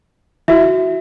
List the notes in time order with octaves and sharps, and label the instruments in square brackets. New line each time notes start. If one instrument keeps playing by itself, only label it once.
[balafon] E4 [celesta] F#4 E5